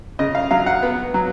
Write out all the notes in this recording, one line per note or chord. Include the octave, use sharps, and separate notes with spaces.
C#3 D#5
F5
F#3 F5
F#5
B3
F#3